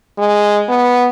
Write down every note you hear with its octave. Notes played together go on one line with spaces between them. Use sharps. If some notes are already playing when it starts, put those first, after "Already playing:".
G#3
B3